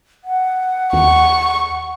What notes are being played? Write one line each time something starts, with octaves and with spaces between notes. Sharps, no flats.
F#5
D#2 C#6